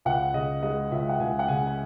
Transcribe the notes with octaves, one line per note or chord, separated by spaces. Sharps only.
C#2 F#5
C#3 D#5
G#3 D#5
C#2 E5
F#5
C#2 G#5
F#5
C#3 G#5
G#5